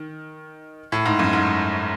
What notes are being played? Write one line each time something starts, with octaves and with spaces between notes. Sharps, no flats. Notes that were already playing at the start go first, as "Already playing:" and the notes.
Already playing: D#3
A2
G#2
F#2
G#2